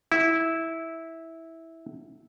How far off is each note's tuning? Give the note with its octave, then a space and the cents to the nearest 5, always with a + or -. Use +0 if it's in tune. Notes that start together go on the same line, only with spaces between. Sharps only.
E4 -10